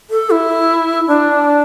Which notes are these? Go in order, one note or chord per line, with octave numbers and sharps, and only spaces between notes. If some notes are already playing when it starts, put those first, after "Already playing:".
A4
E4
D4